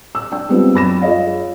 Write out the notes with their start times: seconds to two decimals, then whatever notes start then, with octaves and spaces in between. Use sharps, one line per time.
0.15 E6
0.32 D4 G5 E6
0.49 G3 G#3 B3 C4 D4 F4
0.74 F#2 B5 A#6 E7
1.02 F4 G#4 C#5 D#5 F5